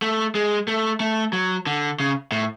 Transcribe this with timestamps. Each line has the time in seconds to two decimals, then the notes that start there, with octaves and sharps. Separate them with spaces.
0.02 A3
0.35 G#3
0.68 A3
1.00 A3
1.33 F#3
1.66 D3
2.00 C#3
2.32 A2